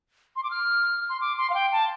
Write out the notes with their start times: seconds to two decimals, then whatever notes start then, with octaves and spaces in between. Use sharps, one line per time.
0.36 C6
0.44 D6
0.51 F6
1.09 C6
1.21 D6
1.38 C6
1.50 F5
1.54 G5
1.72 A5